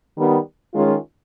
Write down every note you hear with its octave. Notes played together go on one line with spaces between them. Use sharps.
D#3 G3 B3
D#3 G#3 C#4 F4